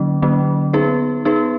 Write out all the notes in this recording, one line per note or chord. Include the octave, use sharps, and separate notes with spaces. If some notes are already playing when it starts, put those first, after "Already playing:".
Already playing: D3 F#3 A#3 C#4
D3 F#3 A#3 C#4
B3 D#4 G#4 B4
B3 D#4 G#4 B4